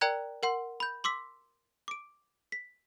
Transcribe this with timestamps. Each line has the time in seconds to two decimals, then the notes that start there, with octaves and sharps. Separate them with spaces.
0.01 A#4 D5 G5 A#5 F#6 G#6
0.43 A#4 F#5 C6
0.80 B5 G6
1.04 C6 D6 E6 B6
1.88 D6 D7
2.52 B6